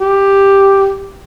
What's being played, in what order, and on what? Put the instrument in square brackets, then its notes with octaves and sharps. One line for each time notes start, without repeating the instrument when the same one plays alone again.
[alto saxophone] G4